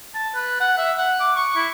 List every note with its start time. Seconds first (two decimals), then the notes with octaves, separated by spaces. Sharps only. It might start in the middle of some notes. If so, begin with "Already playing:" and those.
0.15 A5
0.35 B4
0.60 F#5
0.78 E5
0.97 F#5
1.20 D6
1.36 C#6
1.56 E4